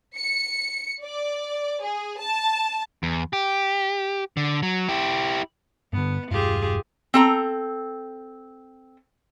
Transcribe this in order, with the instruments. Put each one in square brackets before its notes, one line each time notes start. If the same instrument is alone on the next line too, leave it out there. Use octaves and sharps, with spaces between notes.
[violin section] C#7
D5
G#4
A5
[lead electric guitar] E2
G4
D3
F#3
E4 G4
[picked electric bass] G2 D3 [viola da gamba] B3
[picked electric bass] E1 G2 [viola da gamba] F4 G4 G#4
[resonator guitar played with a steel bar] C4 A4 A#5